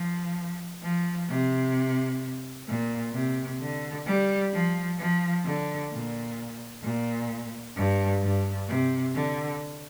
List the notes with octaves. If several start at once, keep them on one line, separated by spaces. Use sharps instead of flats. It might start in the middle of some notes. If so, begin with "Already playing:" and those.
Already playing: F3
F3
C3
A#2
C3
D3
G3
F3
F3
D3
A#2
A#2
G2
G2
C3
D3